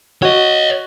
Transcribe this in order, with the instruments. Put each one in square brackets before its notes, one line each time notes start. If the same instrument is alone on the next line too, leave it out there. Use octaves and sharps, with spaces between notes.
[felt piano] F#4 [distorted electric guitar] C#5 D#5